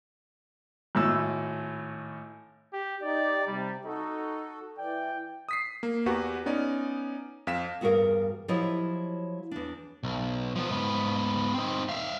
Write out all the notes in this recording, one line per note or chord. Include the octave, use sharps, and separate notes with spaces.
G#1 A2 E6
G4
D#4 G4 D5
C3 G3
D#4 F#4 A4
E3 D5 G5
D#6 B6 C7
A#3
E2 F#4 G4 B4 F#5
B3 C#4 D#4 D5
F2 F5 B6 E7
E2 G2 F#4 G#4 A#4 F5
F3 F#3 E4 G4 C#5 D#5
E2 D4
B1
F3 B3
G#2 B3
C4 D#4
E5 F5